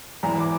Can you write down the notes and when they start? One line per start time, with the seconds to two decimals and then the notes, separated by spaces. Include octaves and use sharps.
0.23 E1 E2 E3 A#5
0.40 D6